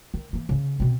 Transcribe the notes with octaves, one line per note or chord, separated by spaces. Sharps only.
D#3
E3 A#3
C#3 C#4
B2 C4